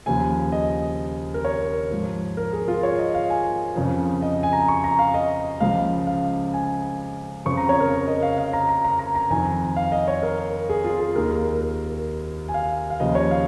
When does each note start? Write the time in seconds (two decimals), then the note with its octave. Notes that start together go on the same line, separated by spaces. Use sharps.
0.06 D#2 C#3 F3 G#5
0.52 D#5
1.34 A#4
1.45 C#5
1.91 G#2 F3
2.37 A#4
2.53 G#4
2.68 F4
2.83 C#5
2.99 D#5
3.15 F5
3.30 G#5
3.76 F2 C#3 F3
4.22 D#5
4.43 G#5
4.53 A#5
4.69 C#6
4.84 A#5
4.99 F5
5.14 D#5
5.60 C#2 C#3 F3 F5
6.07 F5
6.54 G#5
7.45 F2 C#3 F3 C#6
7.57 A#5
7.69 C#5
7.80 A#4
8.07 D#5
8.22 F5
8.38 F5
8.53 A#5
8.69 A#5
8.85 A#5
8.99 A#5
9.15 A#5
9.30 F2 D#3 G#5
9.76 F5
9.92 D#5
10.08 C#5
10.23 A#4
10.69 G#4
10.84 F4
11.00 G#4
11.15 D#2 D#3 A#4
11.61 A#4
12.49 G#5
12.54 F5
12.90 F5
13.00 D#2 C#3 F3 D#5
13.15 C#5
13.31 F5